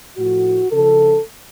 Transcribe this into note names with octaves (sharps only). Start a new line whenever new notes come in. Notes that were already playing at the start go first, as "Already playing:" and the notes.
A2 F3 F#4
C#3 F3 A4